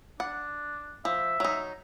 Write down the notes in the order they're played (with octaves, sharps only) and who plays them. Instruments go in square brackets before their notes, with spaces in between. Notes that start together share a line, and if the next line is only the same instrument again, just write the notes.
[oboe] D4 [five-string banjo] F#5
[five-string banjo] F3 [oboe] E5
[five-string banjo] F#3 D#4